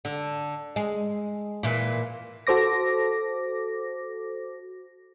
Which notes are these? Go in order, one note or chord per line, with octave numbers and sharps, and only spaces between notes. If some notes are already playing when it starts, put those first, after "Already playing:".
D3
G#3
A#2 E3
F#4 A4 C5 D6 A#6